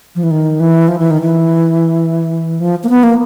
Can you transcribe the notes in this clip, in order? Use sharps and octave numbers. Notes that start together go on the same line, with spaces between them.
F3
E3
D#3
E3
F3
E3
D#3
E3
F3
A#3
B3
A#3